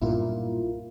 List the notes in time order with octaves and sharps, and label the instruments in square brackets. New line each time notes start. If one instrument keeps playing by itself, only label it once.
[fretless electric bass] B1 G2 A#2 [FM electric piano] E4 F4 A#4